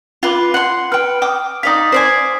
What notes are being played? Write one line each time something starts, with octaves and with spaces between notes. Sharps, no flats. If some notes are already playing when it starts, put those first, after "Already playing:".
F4 B4 D6
F#5 C6
B4 G5 F6
G5 D6 D#6
D#4 D5 F5 D#6 B6
C5 D5 G#5